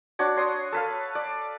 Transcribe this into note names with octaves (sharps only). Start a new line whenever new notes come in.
D4 F#4 C#5
C#5 C6 D#6
A4 B4 F5
D5